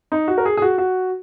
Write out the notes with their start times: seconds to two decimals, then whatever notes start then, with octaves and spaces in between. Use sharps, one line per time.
0.12 D#4
0.28 F#4
0.38 A#4
0.45 G#4
0.57 G#4
0.62 F#4
0.78 F#4